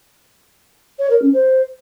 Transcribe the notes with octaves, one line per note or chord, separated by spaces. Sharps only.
C#5
A#4
C#4
C5